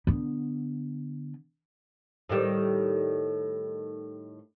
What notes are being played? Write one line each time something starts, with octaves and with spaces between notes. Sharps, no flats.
D3 B3
A2 D#3 G3